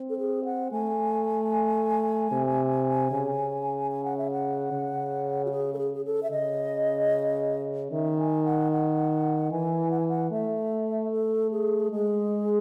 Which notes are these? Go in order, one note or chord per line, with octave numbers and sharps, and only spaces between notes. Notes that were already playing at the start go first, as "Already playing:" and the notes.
Already playing: C4
A4
G#4
F#5
A3 G#5
C3
C#3
G#5
F#5
E5
F#5
C#3
F#4
G#4
A4
G#4
G#4
A4
E5
C#3 D#5
D#3 E5
G#5
F#5
F#5
E3 G#5
F#5
G#5
F#5
A3 E5
A4
G#4
G#3 G#4